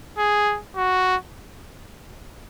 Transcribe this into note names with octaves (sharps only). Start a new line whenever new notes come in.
G#4
F#4